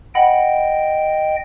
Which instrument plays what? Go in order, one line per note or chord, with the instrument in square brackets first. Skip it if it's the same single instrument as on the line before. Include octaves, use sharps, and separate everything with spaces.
[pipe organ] D#5 G5 [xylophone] F#5 B5